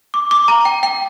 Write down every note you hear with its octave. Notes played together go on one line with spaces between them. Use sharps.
D6
D6
A#5
G5
G5